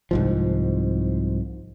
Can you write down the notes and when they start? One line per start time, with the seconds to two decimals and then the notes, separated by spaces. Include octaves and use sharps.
0.11 C2 G#2 F3